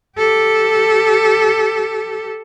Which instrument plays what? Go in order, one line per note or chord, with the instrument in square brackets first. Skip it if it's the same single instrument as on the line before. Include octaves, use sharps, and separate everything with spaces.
[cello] G4 A4